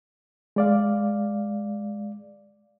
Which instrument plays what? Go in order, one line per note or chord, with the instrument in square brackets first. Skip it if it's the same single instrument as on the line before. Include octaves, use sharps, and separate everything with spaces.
[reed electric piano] G#3 D5 F5